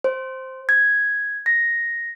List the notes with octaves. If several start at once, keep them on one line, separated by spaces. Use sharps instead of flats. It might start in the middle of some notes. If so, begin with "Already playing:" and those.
C5
G#6
A#6